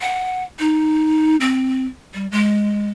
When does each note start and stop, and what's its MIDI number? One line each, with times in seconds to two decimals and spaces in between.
0.01 0.44 78
0.59 1.36 63
1.41 1.86 60
2.14 2.27 55
2.32 2.90 56